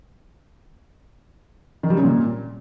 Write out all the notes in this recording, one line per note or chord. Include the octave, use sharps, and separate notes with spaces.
D#3
G3
C#3
A#2